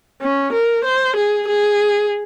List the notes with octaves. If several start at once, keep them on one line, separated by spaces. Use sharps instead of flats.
C#4
A#4
C5
G#4
G#4